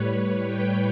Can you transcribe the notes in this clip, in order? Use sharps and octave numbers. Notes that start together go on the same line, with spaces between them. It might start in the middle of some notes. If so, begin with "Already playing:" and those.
Already playing: A2 G3 B4 C#5
G5